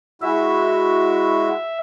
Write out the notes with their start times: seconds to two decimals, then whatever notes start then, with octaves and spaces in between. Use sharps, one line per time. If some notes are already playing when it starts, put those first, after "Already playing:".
0.22 G#3 E4 F#4 E5